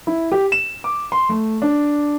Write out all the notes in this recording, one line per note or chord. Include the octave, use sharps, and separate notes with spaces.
E4
G4
E7
D6
C6
A3
D4